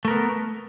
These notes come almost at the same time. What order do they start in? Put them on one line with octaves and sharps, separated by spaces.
A3 A#4 B3